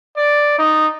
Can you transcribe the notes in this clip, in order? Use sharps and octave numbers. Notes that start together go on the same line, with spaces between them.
D5
D#4